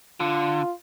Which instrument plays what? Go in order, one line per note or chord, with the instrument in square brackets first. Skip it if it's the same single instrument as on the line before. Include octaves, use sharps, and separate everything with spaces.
[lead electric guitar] D3 [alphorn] F4